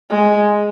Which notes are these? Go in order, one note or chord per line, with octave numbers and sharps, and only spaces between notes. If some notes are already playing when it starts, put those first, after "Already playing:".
G#3